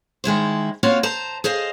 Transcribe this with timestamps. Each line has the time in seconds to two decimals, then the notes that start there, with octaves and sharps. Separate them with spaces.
0.24 D#3 G#3 E4 C5
0.83 A#3 C4 F4 F#4 C#5
1.03 C5 A5 A#5
1.44 G#4 C5 D#5 F5